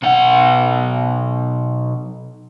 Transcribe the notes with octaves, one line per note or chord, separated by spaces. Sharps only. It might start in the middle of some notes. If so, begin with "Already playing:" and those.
B1 F#5